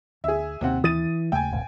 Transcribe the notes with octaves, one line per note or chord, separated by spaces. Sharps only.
D2 G#4 E5
D#2 C3 C4 F#5
E3 D#6 A6 D#7
D#2 C#3 A3 G5 G#5
D#1 G#1